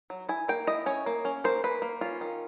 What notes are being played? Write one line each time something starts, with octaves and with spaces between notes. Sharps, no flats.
F#3
E4 G#5
A#3 G5
E4 D#5
C#4 C#5
A#3
C#4
A#3 C5
A#3 B4
A#3
C#4 F4
D#3